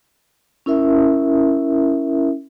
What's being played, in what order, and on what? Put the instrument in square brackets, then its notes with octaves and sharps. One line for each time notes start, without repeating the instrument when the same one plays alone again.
[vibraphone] C#4 E4 A#4 E5